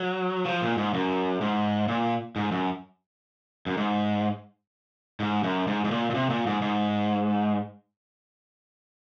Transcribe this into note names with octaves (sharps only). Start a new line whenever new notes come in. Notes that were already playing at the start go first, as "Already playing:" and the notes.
Already playing: F#3
F3
A#2
G#2
F#2
G#2
A#2
G#2
F#2
F#2
G#2
G#2
F#2
G#2
G#2
A#2
A#2
C3
A#2
G#2
G#2